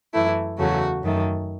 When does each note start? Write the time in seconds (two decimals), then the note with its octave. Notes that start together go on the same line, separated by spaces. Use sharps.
0.14 F#2 E3 A3 E4
0.59 E2 C#3 F#3 A3 F#4
1.03 F#2 D#3 A3